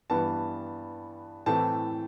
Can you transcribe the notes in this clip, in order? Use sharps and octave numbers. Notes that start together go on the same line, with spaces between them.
G2 E3 B3 A5
A2 E3 A3 C4 A5